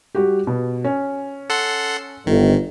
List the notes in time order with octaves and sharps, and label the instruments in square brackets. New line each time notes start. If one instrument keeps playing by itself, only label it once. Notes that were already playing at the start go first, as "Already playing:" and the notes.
[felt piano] G3 F#4 G4
B2
C#4
[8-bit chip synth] A4 F#5 C6
[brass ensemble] G1 [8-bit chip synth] D#3